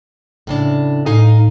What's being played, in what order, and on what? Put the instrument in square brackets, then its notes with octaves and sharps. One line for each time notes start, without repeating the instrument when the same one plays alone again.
[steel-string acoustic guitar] A2 C#3 D4
[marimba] A2 [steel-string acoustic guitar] D#4 F5 G#5